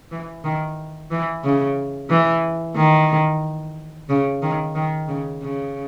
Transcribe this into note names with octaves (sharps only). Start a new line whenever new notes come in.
E3
D#3
E3
C#3
E3
D#3
C#3
D#3
D#3
C#3
C#3